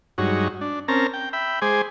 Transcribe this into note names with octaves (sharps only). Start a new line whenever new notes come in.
G2 F#3 G#3 D#4 F#4 C#5
D4
C4 C#4 A#4 A5 A#5
G5
E5 G5 B5
G#3 G#4 C5 G#5 D6